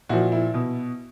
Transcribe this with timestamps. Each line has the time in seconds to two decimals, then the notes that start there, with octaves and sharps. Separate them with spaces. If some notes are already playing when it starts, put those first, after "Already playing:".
0.09 A#2 F3 E4 F#4
0.32 E4
0.54 B2